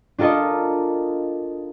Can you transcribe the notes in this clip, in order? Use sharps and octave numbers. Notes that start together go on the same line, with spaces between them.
D4 F4 A4 A#4 D#5